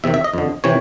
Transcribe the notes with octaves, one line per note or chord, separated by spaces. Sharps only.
E2 C3 D#3 E5
E5
D#5
F2 D3
C3 E3 C#5